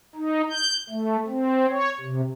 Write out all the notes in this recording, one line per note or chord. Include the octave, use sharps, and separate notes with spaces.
D#4
G6
A3
C4
C#5
C3